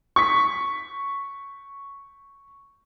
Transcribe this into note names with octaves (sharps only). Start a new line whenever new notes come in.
C#6 B6